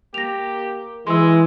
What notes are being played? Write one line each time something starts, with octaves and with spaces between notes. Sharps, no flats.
A#3 G4 A#6 F7
E3 G#3 G#4 C6 E6